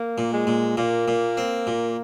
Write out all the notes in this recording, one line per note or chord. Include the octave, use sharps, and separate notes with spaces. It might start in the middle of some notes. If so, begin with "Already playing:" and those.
Already playing: A#3
A#2
G#3
A#2
A#2 A#3
A#2
C4
A#2